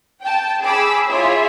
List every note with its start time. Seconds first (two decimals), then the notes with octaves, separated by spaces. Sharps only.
0.21 G5 A5
0.62 G#4 B5 D6 E6
1.10 E4 F4 G#4 C#5 E5